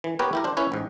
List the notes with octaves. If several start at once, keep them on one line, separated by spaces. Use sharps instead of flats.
E3
B3 G4 A#4 B4 C#5 G5
E4 G4 A#4
D4 C5
C#4 E4 B4 C#5
A1 G#2